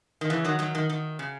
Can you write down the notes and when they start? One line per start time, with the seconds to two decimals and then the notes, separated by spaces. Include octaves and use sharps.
0.21 D#3
0.30 C#3 E3
0.44 D#3 F#3
0.59 D#3 F#3
0.75 D#3
0.89 D#3
1.19 C#3